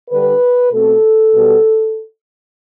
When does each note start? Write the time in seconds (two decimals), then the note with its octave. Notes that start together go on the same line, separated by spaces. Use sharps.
0.10 D3 G3 D4 B4
0.72 B2 A3 C4 A4
1.35 B2 G3 B3